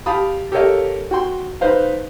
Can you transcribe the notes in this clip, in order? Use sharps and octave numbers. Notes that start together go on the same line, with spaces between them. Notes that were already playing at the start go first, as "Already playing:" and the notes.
G4 F5 A5 B5 D#6
G4 A4 A#4 C#5 D#5 F5
F#4 G5 C6
D#4 B4 C5 F5